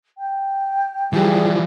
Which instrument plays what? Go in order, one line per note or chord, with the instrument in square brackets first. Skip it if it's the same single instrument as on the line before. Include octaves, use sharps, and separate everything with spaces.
[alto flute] G5
[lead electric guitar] E3 F3 [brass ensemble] G3 [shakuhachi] G#4